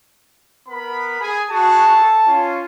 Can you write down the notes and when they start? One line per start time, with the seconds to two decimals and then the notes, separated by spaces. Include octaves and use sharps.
0.68 B3 A#4 B5
1.21 G#4 G#5
1.51 F#4 G#4 A5
1.95 A4
2.27 C#4 F4